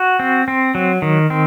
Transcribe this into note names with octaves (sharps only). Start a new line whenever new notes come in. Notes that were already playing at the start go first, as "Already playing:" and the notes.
Already playing: F#4
C4
C4
F#3
D#3
C4